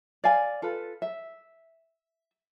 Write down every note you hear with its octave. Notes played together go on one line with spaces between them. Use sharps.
D5 F5 G#5
F4 A4 B4
E5